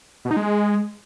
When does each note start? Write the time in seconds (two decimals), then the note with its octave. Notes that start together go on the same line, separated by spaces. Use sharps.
0.25 B2
0.31 D#4
0.37 G#3